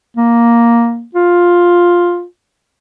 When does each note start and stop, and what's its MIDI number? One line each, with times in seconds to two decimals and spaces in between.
0.17 1.05 58
1.15 2.24 65